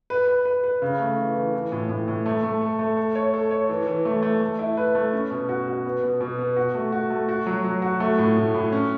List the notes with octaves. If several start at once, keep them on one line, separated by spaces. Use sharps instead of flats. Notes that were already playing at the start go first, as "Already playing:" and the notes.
B4
B4
B4
B4
C#3
A3
E3
E3
E3
A2
A2
A2
A3
A3
A4
A3
A4
C#5
A4
C#5
E3
E3
A3
A3
A3
E4
B4
A3
C#4
B2
F#4
F#4
B3
B2
B2
B3
F#4
A3
F#4
A3
F#4
F#3
F#3
F#4
A3
A2
A2
A2
C#4